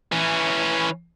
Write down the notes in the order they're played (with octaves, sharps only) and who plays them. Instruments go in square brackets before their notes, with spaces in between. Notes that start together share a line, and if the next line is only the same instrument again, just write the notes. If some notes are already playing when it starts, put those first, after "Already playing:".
[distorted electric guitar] E3 C#4